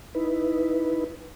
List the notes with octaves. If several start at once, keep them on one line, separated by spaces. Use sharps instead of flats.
D#4 E4 B4